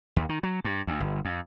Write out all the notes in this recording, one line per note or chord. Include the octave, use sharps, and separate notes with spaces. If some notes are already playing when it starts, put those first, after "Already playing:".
D#2
D#3
F#3
G2
D2
G1
F2